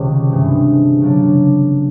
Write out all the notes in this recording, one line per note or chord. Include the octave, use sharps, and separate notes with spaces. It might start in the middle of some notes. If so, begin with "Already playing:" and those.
Already playing: C#2 C3 D#3 G3
G1 G2 E3 G#3 C4
C#3 F#3 A#3 D4